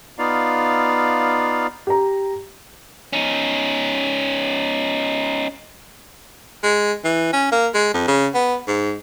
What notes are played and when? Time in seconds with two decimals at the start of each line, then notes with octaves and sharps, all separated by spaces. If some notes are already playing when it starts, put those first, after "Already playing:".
0.19 B3 D#4 F4 D5 F5
1.87 G4 A#5
3.13 C#4 D#4
6.63 G#3
7.04 E3
7.33 C#4
7.52 A#3
7.74 G#3
7.94 F2
8.08 C#3
8.35 B3
8.67 G#2